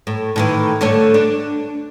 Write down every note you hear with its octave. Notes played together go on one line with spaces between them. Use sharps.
A2
A2 D#3 E3
D3 A3 C#5
D4